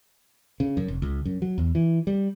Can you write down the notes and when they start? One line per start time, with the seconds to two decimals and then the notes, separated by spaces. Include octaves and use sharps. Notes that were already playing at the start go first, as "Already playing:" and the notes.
0.60 C#3
0.77 F#2
0.88 F1
1.02 C#2
1.25 F#2
1.42 F#3
1.58 E2
1.75 E3
2.07 G3